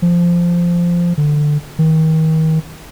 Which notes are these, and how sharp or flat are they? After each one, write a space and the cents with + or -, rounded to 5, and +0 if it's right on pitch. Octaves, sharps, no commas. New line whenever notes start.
F3 -10
D3 +15
D#3 +35